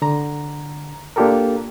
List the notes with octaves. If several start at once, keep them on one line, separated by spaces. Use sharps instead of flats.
D3 A#5
A#3 D4 F4 G4 A4 A#4